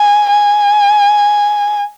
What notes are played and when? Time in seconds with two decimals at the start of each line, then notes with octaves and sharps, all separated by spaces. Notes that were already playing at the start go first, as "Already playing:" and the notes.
Already playing: G#5
0.30 G#5